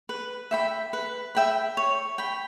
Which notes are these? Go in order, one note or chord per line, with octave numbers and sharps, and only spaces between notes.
B4
E5 G5 B5
B4
E5 G5 B5
C#5
G5 B5